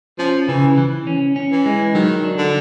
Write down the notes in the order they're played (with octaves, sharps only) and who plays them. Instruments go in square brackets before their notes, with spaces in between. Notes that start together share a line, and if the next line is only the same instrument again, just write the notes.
[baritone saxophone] F3 [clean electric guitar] C#4
[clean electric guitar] C#3 [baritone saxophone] E3
[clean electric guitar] E3
C#4
C#4
[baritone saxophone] E3
[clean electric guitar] G#3
[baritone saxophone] D#3 [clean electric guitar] F#3
[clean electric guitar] D4
[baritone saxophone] D3